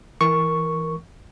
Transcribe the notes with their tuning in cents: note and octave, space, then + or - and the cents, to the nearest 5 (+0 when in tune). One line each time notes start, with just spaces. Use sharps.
E3 +0 A#4 +0 C#6 +0